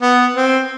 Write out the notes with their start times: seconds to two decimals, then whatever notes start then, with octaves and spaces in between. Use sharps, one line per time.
0.02 B3
0.36 C4